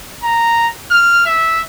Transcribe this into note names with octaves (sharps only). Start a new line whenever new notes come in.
A#5
F6
E5